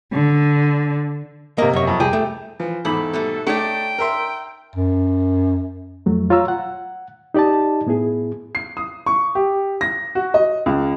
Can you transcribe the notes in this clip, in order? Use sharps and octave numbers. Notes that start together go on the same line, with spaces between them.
D3
C3 A#3 A#4 D#5
F#2 C#5
F2
C2 G4 G#4
A3
E3 F3
E2 G#2 A4 B5
B2 G3 A3
A3 D#4 C#5 D5 G5
A#4 E5 C6
F#2
F2 F#3 A3
F4 C#5 F5 A#5 E6
F#5
D#4 G4 D5 D#5 A5
A2 B3 E4 G#4
C7
D#6
C#6
G4
A#6
F#4
D#5
C#2